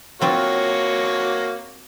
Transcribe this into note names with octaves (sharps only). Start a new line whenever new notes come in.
F#3 A#3 C4 F4 F#4 C#5